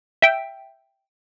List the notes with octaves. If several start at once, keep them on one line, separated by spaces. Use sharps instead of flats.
E5 G5